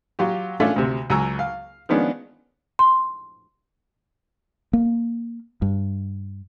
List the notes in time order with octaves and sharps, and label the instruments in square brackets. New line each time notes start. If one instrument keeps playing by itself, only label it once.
[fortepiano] F#3 F4 G4
A3 C#4 D4 F4 D5 E5
D2 C3
C#2 F#3 G#5 A#5 E6
F5
D#3 F3 G#3 B3 C#4 D4
[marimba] C6
[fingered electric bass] A#3
G2